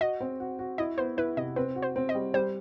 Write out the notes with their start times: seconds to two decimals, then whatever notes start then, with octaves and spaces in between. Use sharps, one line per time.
0.01 F#4 D#5
0.20 C4
0.40 F#4
0.59 F#4
0.78 E4 D#5
0.98 B3 C5
1.17 E4 B4
1.37 C3 D#5
1.56 C4 B4
1.76 F#4
1.82 C5
1.96 C4
2.09 D#5
2.15 G3
2.34 G3 C5